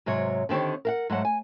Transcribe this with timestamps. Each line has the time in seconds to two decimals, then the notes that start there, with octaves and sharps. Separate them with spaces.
0.06 G#2 C3 F#3 C#5
0.49 D3 D#3 C4 G4 C#5
0.85 A#4 F5 F#5
1.10 G#2 F#3 A3 F#5
1.25 G#5